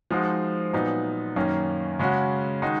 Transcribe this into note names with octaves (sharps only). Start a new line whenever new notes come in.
F3 G#3 D#4 F#4
A#2 F#3 B3 D#4
F#2 D#3 A#3 C#4
C#3 G#3 C#4 F#4
D#3 G#3 D#4 F#4